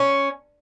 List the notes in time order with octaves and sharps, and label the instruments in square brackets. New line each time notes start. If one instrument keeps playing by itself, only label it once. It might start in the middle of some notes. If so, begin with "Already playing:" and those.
Already playing: [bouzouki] C#4